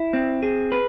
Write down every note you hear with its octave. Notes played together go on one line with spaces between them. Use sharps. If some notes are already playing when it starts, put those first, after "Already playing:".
Already playing: E4
C4
G#4
B4